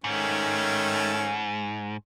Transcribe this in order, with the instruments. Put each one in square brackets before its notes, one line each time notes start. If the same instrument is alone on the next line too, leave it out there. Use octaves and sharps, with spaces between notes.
[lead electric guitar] G#2 [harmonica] D#3 A3 C#4